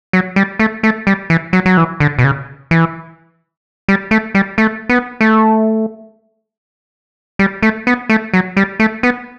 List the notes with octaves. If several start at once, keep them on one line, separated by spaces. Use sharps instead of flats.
F#3
G3
A3
A3
G3
E3
F#3
F#3
E3
D3
B2
C#3
E3
G3
A3
G3
A3
B3
A3
G3
A3
B3
A3
F#3
G3
A3
B3